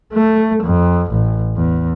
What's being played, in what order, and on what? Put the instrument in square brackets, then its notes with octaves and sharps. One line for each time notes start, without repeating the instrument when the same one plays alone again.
[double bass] A3
F2
A1
E2